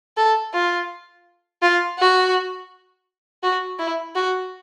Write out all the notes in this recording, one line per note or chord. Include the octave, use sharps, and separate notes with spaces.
A4
F4
F4
F#4
F#4
E4
F#4